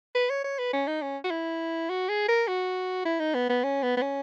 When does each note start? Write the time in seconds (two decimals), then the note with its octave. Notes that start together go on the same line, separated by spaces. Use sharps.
0.15 B4
0.30 C#5
0.44 C#5
0.59 B4
0.73 C#4
0.87 D#4
1.02 C#4
1.24 F#4
1.31 E4
1.90 F#4
2.09 G#4
2.28 A#4
2.48 F#4
3.05 E4
3.20 D#4
3.34 B3
3.49 B3
3.64 C#4
3.83 B3
3.97 B3
4.02 C#4